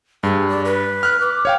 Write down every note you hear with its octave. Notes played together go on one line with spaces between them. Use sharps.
G2 G#4
D5
B4
F6 F#6
D6
C#5 F5 G5